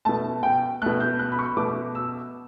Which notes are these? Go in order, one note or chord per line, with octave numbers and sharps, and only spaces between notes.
B2 A3 A5
G5
B2 A3 F#6
G6
F#6
B5
C#6
B2 A3 D6
E6